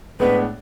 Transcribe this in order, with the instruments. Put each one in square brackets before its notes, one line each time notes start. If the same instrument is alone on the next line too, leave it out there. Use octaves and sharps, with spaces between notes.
[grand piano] A2 G#3 B3 D4 [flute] B4